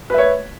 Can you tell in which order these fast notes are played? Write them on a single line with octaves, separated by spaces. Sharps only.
B4 E5 C#5